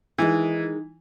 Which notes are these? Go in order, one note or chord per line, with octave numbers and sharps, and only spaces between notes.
D#3 E3 G#3 D#4